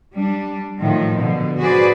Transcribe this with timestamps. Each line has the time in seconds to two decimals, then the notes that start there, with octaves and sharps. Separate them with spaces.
0.14 G3 D4
0.80 A2 D#3 F3
1.17 B2 D3
1.59 F#4 G#4 B4 C5 D5